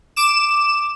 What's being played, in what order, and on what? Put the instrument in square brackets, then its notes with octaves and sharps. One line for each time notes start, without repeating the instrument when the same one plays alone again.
[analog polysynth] D6 E7